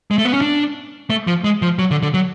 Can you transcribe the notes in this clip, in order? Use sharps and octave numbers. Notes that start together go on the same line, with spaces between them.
G#3
A3
B3
C#4
D4
A3
F3
G#3
F3
F#3
D3
D3
F#3